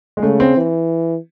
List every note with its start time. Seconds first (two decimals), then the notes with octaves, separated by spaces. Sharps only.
0.17 G#3
0.22 C#3 A3
0.40 C4
0.57 E3